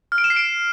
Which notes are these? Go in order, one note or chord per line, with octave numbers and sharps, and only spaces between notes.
F6
D7
E7
C7
D7